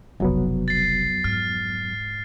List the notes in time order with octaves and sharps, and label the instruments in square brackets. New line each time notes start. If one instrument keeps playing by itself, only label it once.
[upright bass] F1 B1 [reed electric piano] F2 F#3 B3
[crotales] A6 C7
[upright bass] G#2 [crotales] F6